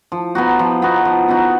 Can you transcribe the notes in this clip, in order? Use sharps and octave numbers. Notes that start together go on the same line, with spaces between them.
F3
B3 D#4 F#4
F3
B3 D#4 F#4
F3
B3 D#4 F#4